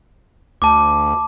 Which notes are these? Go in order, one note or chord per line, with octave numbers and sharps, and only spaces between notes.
D2 A5 D6